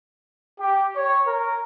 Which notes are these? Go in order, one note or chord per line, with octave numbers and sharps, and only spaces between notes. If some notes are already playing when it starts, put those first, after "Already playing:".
G4
C#5
A#4